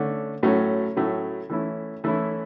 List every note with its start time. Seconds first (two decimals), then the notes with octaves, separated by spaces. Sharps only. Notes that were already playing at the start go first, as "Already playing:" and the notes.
Already playing: D3 A3 C#4
0.43 A2 F#3 A3 C#4
0.97 A2 F#3 A3 C#4
1.50 E3 A3 C#4 E4
2.04 E3 A3 C#4 E4